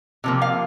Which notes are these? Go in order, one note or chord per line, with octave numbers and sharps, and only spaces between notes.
C3 F3 A#3
F5